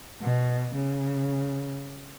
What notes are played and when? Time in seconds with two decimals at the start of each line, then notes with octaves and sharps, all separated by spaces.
0.22 B2
0.76 C#3